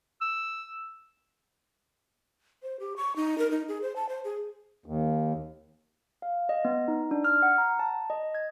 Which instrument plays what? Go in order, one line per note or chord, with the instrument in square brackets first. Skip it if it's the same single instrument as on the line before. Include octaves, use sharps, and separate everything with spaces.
[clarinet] E6
[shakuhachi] C5
G4
C#6
D#4
A#4
D#4
G#4
C5
A5
C5
G#4
[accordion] D#2
[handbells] F5
D#5
B3
D#4
D4
F6
F#5
A#5
A5
D#5
G#6